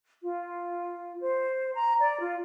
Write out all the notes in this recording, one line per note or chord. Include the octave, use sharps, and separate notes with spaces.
F4
C5
A#5
D5
F4